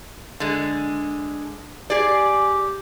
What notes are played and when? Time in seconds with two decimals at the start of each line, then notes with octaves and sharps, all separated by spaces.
0.40 D3 G#3
1.90 G4 G#4 D5